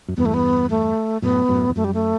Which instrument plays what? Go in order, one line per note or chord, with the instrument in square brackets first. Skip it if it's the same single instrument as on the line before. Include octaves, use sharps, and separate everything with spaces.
[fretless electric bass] F#2
[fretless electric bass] E2 G2 [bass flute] B3
[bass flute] A3
B3
A3
[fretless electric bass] F#2 A2 [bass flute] B3
[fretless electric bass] F#2 A2
E2
[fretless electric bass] F#2 [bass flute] A3
[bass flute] G3
A3